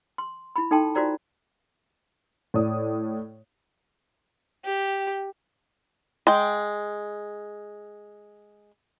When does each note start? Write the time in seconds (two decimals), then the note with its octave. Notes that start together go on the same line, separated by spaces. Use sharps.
0.18 C6
0.56 E4 B5
0.71 D#4 A4 G5 A5 C6
0.95 F4 F#4 C5 D5 A#5
2.54 A2 D5 D#6
4.64 G4
6.27 G#3 G5